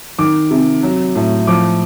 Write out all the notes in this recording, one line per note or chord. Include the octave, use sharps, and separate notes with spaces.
D#3 D6
C3
F#3
A2
F3 D6